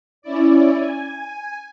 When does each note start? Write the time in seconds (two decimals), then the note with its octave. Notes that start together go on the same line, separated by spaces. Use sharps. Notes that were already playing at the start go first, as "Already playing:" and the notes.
0.22 C#4 E4 D5
0.76 G#5